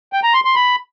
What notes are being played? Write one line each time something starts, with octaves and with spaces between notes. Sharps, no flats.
G5
A#5
C6
C6
B5